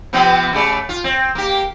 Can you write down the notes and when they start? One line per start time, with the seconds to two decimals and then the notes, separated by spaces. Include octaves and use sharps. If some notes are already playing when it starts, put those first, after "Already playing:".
0.13 C3 F3 B3
0.53 C#3 A3 D5
0.89 F4
1.04 C4
1.35 A#3 G4